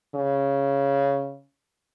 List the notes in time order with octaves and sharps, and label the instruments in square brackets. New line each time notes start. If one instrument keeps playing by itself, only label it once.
[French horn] C#3